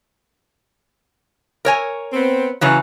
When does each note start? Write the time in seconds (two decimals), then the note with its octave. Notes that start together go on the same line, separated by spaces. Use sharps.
1.65 A#4 C#5 G#5
2.13 B3 C4
2.61 C#3 E3 F#3 C#4